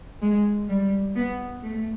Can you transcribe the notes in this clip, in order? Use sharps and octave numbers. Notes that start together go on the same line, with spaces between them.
G#3
G3
B3
A3